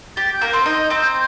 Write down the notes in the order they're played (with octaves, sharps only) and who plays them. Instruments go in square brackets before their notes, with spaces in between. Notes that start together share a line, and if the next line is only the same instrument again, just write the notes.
[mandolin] G4 [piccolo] A6
[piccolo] G6
[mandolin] A#3 A#4
[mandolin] C4 C5 [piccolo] G6
[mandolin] D#4 D#5
C4 C5